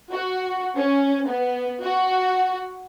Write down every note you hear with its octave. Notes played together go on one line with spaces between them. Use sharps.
F#4
C#4
B3
F#4